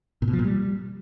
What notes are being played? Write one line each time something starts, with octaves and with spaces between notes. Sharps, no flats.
A#2
B2
F3
A#2
G3